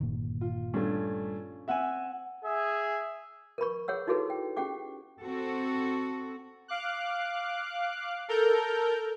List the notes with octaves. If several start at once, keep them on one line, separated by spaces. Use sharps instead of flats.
G1 A#2 D#3
F4
G2 A3 C#4 G#5
C4 E5 F#5 G#5 E6
G#4 E5
A#4 B4 B5 C#6
G#4 C#5 F#5 E6
D#4 E4 F#4 G#4 A4 B4
G5
C#4 G4 G#4 F#5 G5 D6
C4 F#4 A4
F5 D6 F#6
A4 A#4 F6 G6